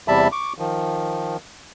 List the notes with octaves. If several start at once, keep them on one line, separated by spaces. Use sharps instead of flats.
E2 C3 G3 E5 A5 B5
C#6 D6
D#3 F3